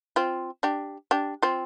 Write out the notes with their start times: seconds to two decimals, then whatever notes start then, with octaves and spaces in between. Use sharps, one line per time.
0.16 C4 F4
0.63 D4 G4
1.11 D4 G4
1.43 C4 F4